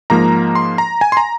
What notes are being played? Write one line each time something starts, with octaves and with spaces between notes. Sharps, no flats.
G#2 F3 A#3 A#5
C6
A#5
G#5
C6
A#5